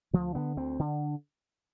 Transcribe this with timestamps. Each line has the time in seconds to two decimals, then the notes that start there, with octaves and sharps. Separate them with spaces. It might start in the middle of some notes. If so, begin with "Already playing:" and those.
0.13 D2 F3
0.35 D3 B3
0.57 D2 C4
0.79 D3